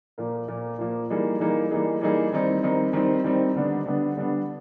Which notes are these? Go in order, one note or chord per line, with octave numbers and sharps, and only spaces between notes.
A#2 F3 A#3
A#2 F3 A#3
A#2 F3 A#3
E3 G3 A#3 D#4 G#4
E3 G3 A#3 D#4 G#4
E3 G3 A#3 D#4 G#4
E3 G3 A#3 D#4 G#4
D#3 G3 C4 D#4
D#3 G3 C4 D#4
D#3 G3 C4 D#4
D#3 G3 C4 D#4
D3 G3 B3 D4
D3 G3 B3 D4
D3 G3 B3 D4